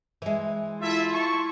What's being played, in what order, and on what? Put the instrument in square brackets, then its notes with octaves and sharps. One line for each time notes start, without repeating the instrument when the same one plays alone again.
[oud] E3 G#3
[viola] E4 F4 [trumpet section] A4 E5
[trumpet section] A5 C#6